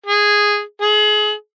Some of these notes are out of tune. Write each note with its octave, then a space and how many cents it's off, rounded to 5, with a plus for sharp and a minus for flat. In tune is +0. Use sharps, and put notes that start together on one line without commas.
G#4 -5
G#4 +30